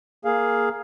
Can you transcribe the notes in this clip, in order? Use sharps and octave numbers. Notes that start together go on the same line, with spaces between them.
A#3 G#4 F5